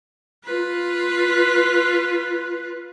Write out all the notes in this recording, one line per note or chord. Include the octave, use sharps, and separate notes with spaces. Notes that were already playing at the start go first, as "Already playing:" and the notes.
F4 B4